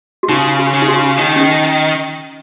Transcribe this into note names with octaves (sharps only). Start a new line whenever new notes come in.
F#4
C#3 D#4
F#4
C#3
D#4
F#4
D#3 D#4
C#4
D#4